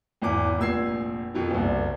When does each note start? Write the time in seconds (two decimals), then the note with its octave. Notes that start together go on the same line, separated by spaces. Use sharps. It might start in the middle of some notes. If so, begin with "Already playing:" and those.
0.22 G#1 E2 E3 D6
0.59 F1 A#1 E6 G#6 C7
1.34 F2 B2 D#3
1.51 F#1 C2